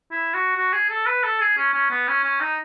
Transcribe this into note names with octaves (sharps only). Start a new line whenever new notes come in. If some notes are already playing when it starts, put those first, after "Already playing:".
E4
F#4
F#4
G#4
A4
B4
A4
G#4
C#4
C#4
B3
C#4
C#4
D#4